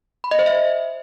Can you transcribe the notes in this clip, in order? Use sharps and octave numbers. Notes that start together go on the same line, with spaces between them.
B5
D#5
C5
E5